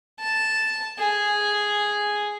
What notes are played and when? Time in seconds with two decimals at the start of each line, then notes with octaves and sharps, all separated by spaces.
0.20 A5
0.99 G#4